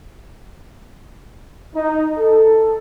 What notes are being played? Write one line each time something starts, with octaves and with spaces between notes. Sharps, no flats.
D#4
A4